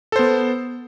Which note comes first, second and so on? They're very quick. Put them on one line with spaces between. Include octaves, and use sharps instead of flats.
A4 C5 B3